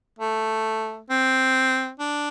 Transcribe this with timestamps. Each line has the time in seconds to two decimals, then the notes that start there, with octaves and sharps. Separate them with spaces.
0.19 A3
1.10 C4
1.99 D4